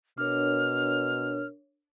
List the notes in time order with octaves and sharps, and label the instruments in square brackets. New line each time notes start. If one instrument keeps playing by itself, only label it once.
[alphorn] B2 [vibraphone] D4 A#4 C#5 [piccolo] F6